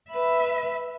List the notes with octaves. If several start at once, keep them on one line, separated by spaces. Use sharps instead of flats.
B4 E5